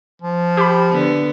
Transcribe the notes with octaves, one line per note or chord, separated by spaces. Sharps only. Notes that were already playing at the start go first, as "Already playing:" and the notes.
F3
G4 B5
D3 B3